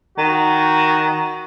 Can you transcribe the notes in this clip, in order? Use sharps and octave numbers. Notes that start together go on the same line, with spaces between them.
D#3 F#4